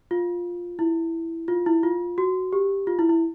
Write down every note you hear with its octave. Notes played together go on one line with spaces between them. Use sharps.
F4
E4
F4
E4
F4
F#4
G4
F4
E4
E4